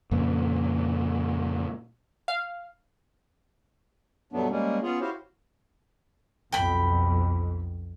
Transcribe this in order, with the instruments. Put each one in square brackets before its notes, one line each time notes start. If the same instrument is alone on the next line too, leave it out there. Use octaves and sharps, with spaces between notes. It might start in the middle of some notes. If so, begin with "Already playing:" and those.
[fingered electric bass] F2 A#2 C#3
[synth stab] F5
[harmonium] G2 B2 F#3 A3 B3 D4
G3 G#3 A#3 C#4
B3 C#4 F4 G#4 C#5
E4 F#4 G4 C5 C#5 F5
[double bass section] B1 F2 [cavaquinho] G5 B5